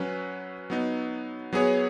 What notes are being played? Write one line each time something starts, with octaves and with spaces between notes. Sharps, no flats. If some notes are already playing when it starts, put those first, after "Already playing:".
Already playing: F#3 C#4 B4
F#3 B3 D#4
F#3 B3 G#4 C#5